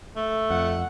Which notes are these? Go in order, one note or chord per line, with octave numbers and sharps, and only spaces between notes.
A3
F2 F#5